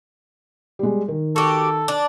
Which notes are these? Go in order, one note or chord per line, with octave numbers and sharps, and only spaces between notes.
G3 G#3
D#3
F#4 G4 A4
D4